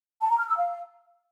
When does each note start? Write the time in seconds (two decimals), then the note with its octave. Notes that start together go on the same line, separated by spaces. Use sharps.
0.21 A5
0.30 A#5
0.39 F6
0.48 E6
0.56 F5